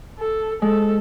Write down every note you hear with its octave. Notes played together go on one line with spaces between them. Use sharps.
A4
G#3 A4